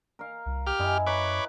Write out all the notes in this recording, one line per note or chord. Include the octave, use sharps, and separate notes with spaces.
A#4 F5
C2
G4 F6
F#2 E4 D#5 G#5
B4 C#5 A#5 B5 D6